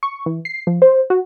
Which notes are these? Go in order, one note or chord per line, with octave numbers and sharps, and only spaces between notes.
C#6
E3
C7
F3
C5
F#4